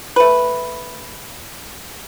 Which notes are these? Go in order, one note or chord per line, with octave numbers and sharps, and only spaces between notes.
A3 B4